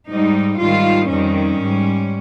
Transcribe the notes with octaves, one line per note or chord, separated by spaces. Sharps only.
G#2 G3 D#4
G#2 D#3 G3 F4
F2 D#3 G3 C#4
G#2 G3